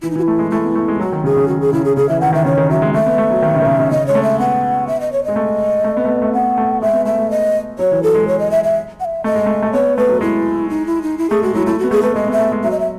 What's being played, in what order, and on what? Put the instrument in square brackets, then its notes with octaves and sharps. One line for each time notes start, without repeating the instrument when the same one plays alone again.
[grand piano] E3 [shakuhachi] E4
[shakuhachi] D#4
[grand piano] E3 [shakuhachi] F#4
[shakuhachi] E4
[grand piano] A3
G#3
[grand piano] A3 [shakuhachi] E4
[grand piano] B3
A3
G#3
[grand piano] F#3 [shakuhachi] F#4
[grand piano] D#3
[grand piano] C#3 [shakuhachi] G#4
[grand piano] C#3
[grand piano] D#3 [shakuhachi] F#4
[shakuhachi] G#4
[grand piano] C#3 [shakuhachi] E4
[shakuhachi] G#4
[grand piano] C#3 [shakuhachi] G#4
[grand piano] E3 [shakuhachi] E5
[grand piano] D#3 [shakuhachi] F#5
[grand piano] D#3 [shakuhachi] E5
[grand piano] C#3 [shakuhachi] C#5
[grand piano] D#3
[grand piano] F#3 [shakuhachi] E5
[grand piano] G#3
[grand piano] A3 [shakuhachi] E5
[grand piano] B3
A3
F#3
D#3
C#3
D#3
C#3
C#3
[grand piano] C#3 [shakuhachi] D#5
[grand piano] G#3 [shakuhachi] C#5
[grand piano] A3
[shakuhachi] E5
[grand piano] B3 [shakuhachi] F#5
[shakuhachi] E5
D#5
C#5
[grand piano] G#3 [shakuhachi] D#5
[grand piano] A3
A3
B3
A3
B3
A3
[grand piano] B3 [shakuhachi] F#5
[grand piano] A3
[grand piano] G#3 [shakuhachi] E5
[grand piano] B3
[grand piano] A3 [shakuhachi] E5
[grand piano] A3
[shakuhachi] D#5
[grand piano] F#3 [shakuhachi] C#5
[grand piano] E3
[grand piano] F#3 [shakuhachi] A4
[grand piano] G#3
[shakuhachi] C#5
D#5
E5
E5
F#5
E5
[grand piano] A3 [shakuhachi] D#5
[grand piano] G#3
A3
A3
[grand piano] B3 [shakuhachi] C#5
[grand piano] A3 [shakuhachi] B4
[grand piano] F#3
[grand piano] G#3 [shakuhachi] E4
[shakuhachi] D#4
E4
D#4
E4
[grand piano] A3 [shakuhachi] G#4
[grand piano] G#3 [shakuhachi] F#4
[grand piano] F#3 [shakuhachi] E4
[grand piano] A3 [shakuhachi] E4
[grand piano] B3 [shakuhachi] F#4
[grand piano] A3 [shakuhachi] G#4
[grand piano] A3 [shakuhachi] B4
[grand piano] G#3 [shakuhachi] D#5
[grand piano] B3
[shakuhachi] E5
[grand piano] A3
G#3
[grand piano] F#3 [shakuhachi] E5
[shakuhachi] D#5
E5